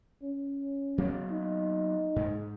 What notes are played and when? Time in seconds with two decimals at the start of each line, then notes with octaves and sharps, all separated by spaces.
0.23 C#4
0.98 F#3 A#3 B3
1.31 D#4
2.16 G#2 G#3